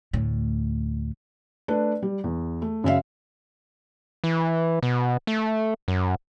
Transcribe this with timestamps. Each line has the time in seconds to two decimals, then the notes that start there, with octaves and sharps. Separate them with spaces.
0.13 D2 A2
1.68 A3 D4 B4
2.03 G3
2.24 E2
2.62 A3
2.84 F#2 C#3 E5 F5
4.24 E3
4.83 B2
5.27 A3
5.88 F#2